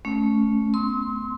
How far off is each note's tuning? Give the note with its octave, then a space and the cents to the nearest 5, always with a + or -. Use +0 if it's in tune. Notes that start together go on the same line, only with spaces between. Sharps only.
A3 -20 C#4 +0
B3 +25 C6 +0 E6 -40